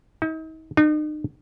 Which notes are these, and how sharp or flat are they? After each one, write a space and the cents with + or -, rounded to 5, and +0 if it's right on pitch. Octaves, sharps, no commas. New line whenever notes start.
D#4 +40
D#4 -40